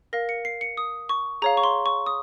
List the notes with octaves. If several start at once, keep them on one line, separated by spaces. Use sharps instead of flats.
A#4 F5 A#6
C#7
C7
C#7
D#6
C#6
G#4 C#5 F5 A#5
C#6
C6
C#6
D#6